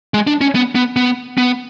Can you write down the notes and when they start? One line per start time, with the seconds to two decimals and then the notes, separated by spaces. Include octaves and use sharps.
0.14 G#3
0.27 D4
0.41 C#4
0.55 B3
0.75 B3
0.96 B3
1.38 B3